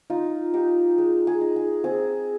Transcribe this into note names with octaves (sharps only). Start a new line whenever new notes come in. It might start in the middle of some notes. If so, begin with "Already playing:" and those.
D#4 F4
D#4 G4
G#3
G#4
D#4
G#4
C4 G#4